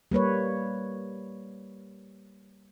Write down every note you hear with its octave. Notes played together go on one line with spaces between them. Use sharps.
G3 A#3 B4 C#5